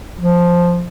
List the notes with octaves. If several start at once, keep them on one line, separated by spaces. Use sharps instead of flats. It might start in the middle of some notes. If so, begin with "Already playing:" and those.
F3